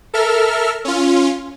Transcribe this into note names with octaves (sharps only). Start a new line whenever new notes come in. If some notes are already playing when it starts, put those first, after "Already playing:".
A4 A#4 E5 F6
C#4 F4